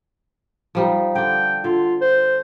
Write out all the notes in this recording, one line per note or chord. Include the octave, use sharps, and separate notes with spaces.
F3 G3 D#4
D3 D4 G5
D3 F4
C5